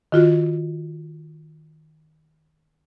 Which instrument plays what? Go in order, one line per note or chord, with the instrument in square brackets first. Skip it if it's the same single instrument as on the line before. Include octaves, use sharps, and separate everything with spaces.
[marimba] D#3 F4 F#4